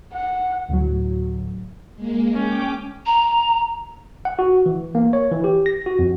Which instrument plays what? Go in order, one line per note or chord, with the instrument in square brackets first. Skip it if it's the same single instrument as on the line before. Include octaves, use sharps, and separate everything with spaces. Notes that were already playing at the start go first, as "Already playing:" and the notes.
[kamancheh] F#5
[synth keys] D2 A2 F#3
[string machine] G#3 A#3
[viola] C#4 [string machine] G5 D6
[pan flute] A#5
[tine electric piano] F#5
F#4
E3
A#3
C#5
E3
G4
A#6
F#4
F2